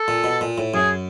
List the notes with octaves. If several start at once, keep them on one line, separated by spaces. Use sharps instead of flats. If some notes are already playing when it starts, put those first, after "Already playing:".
Already playing: A4
A#2
B2
A#2
A2
F#2 G#4